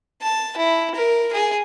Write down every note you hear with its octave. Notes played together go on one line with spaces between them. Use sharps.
A5
E4
A#4
G#4